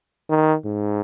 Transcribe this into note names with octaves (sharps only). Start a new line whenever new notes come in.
D#3
G#2